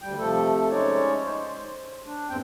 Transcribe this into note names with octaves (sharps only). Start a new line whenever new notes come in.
D2 G3 G5
C3 F3 A3 A4
G#3 C#4 D#4 C#5 D5
C5
D4
E2 G2 C4 G5